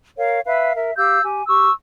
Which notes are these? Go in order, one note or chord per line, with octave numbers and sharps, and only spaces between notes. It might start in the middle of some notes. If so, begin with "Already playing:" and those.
A#4 C#5 F5
B4 E5 F5
A#4 E5
G4 F5 E6 G6
G4 G#5
G4 C#6 E6